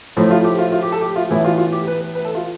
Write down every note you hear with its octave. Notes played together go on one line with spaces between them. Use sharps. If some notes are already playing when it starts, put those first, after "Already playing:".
A2 F3 A3 C4
F4
G4
F4
F4
G4
A4
G4
F4
A2 E3 B3 E4
F4
F4
G4
B4
B4
B4
A4
F4